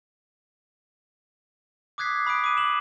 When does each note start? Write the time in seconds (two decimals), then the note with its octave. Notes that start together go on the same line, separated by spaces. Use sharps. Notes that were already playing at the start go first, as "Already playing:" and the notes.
1.98 D6 D#6 F#6 G#6 B6 C7
2.27 B5 D#6 F#6 D7
2.44 D6 D#7
2.57 E7 F#7